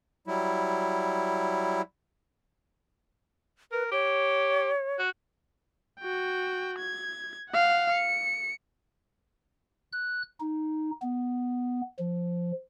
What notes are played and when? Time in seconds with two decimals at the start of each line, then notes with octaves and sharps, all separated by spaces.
0.27 F#3 G3 E4
3.72 A#4 B4
3.92 G4 C#5
4.99 F#4
6.00 F#4 G5
6.78 G#6
7.50 F5 F#5
7.92 C#7
9.92 F#6
10.40 D#4
11.02 B3
11.99 F3